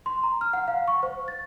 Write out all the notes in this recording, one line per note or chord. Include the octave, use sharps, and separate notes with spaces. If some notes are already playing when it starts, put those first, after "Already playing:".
C6
A#5
F6
F#5
F5
C#6
C5
A6